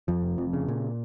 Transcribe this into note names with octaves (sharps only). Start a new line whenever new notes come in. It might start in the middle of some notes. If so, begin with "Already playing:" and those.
F2 F3
F1
F2
C#3
A#2